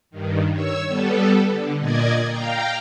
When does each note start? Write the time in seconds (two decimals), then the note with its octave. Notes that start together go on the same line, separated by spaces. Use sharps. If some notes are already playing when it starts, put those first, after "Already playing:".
0.11 G2 D#3
0.52 C#5 E6
0.87 G3 B3 A4
1.50 D3
1.79 A#2 D5 D#5 G#6
2.27 F5 G5 A#5